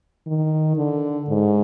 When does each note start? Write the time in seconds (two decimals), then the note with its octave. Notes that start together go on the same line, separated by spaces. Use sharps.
0.27 D#3
0.77 D3
1.28 G#2